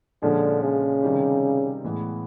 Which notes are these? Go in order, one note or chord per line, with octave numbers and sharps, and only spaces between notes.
A#2 D3 F3 G#3 C#4
C#3
C3 D#3 G3
A2 E3 G#3 B3